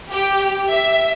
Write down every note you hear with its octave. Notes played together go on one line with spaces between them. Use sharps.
G4
E5